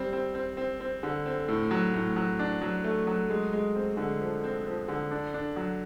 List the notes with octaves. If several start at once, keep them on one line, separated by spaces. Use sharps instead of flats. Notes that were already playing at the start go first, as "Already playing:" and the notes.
Already playing: G3 C4
C4
C4
C4
C4
D3
C4
A2
F#3
A2
F#3
D4
F#3
A3
F#3
G#3
G#3
C4
D3
F3
C4
F3
D3
D4
D4
F#3